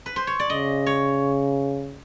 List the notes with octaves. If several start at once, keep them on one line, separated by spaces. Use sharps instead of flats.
B4
C5
C#5
D5
C#3 D#5
C#5